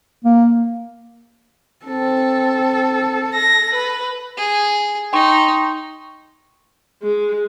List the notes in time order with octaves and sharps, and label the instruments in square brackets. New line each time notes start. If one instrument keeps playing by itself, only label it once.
[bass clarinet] A#3
[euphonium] C4 [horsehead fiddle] A4
[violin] A#6
B4
[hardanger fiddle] G#4
[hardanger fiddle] D#4 [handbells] G5 C6 C#6
[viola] G#3